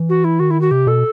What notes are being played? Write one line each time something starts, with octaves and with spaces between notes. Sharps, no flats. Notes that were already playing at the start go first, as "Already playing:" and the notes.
Already playing: E3
F#4
E4
D#3 F#4
E4
F#4
C3 G4
B2 A4